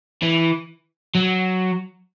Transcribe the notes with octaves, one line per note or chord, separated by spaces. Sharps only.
E3
F#3